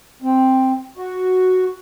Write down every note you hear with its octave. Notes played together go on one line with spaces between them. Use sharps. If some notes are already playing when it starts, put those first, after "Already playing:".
C4
F#4